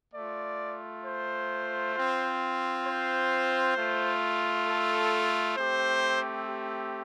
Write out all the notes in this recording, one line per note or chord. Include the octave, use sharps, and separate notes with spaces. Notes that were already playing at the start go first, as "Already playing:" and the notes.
A3 F4 D5
C5
C4 F4
C5
A3 F4
A4
A3 C4 G4 C5
G4